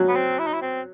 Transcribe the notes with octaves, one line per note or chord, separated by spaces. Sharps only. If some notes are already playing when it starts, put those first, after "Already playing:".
Already playing: F#3
B3
C4
E4
D#4
E4
C4